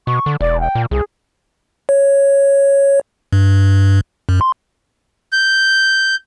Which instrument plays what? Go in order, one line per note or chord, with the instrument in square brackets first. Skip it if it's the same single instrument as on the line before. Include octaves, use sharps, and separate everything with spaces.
[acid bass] B2 [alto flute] C#6
[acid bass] D3
[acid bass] E1 [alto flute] D5
[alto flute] G5
[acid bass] A#2
[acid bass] C2 [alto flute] G#4
[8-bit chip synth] C#5
G2
F#2
C6
[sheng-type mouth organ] G6